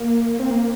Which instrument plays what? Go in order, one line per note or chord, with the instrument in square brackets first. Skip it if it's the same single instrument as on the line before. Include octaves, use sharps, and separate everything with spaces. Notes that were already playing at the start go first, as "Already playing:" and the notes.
Already playing: [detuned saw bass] A#3
C4
A#3